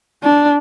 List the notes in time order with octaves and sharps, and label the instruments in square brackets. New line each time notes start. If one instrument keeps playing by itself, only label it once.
[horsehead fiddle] D4